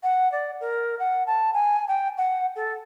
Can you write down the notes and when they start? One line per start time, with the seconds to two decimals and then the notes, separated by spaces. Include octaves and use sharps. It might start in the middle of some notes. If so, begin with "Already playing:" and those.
0.03 F#5
0.32 D5
0.61 A#4
0.99 F#5
1.27 A5
1.53 G#5
1.88 G5
2.17 F#5
2.56 A4